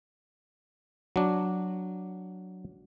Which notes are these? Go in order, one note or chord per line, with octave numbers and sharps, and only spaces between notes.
F#3 D4